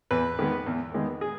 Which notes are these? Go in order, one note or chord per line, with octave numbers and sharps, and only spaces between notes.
E2 B4
D#3 G#3 B3
E2
D#3 G#3 B3
G#4